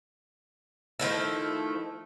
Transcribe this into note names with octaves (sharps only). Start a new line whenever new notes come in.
D#3 F3 A3 E4